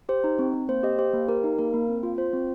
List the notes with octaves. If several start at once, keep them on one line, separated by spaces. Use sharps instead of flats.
G4 C5
D#4
C4
C4
A#3 C5
G4 D#5
G4 C5
A#3
G4 A#4
D#4
A#3 A#4
A#3
C4
F4
F4 C5
C4